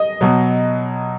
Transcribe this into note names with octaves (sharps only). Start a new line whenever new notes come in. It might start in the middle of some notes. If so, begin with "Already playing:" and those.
Already playing: D#5
B2 F#3